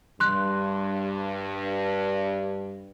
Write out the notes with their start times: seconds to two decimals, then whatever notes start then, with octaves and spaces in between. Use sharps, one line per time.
0.20 G2 C6 F#6